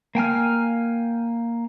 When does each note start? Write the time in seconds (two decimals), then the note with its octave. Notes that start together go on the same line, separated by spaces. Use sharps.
0.15 A#3 G5 G#5 F6